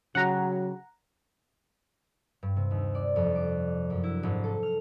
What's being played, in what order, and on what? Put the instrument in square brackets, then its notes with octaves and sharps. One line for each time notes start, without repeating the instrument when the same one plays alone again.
[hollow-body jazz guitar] C#3 F#4 G4 [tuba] F#3 [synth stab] F#5 A#5
[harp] G2
C3
D#2
D5
F2
D6
F#2
E4
G#1
A4
F6